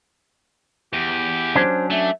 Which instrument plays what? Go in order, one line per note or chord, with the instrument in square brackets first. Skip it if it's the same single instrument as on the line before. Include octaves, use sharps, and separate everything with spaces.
[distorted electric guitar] E2 [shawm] G4
[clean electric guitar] F#3 C#4 D4 [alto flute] C5
[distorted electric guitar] A3 [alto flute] E5